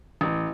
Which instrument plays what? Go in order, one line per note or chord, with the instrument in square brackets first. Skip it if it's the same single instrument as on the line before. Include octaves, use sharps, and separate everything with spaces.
[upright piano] A1